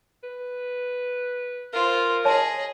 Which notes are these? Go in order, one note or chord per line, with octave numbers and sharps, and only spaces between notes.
B4
F4 A#4 C5
G#4 C#5 D#5 A5 C6